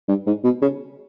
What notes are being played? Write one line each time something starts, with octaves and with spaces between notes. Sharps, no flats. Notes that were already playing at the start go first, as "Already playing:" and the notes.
G2
G#2
B2
C#3